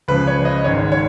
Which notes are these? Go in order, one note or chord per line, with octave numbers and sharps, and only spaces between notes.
C#2 C#3 F3 B4
C#5
D#5
G#1 G#2 D#3 C#5
C#5